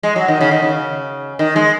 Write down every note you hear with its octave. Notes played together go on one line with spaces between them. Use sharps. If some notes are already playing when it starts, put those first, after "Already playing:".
G#3
F#3
D#3
C#3
D#3
C#3
D#3
G#3